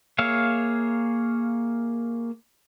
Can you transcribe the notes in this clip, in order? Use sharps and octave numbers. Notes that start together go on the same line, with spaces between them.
A#3 G#4 C#5 E5 F5